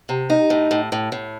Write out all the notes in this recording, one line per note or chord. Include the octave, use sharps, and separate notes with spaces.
C3
D#4
A2
A2
A2
A2